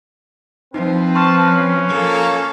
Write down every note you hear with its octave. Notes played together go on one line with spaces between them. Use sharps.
F3 C4 D#4 B4
A5 C6 C#6 F6
C#4 F#6
F3 A#3 A4